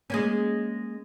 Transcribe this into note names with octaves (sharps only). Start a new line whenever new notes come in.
G#3 A#3 C#4